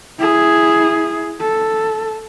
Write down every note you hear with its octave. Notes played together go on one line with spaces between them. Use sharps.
E4 G#4
A4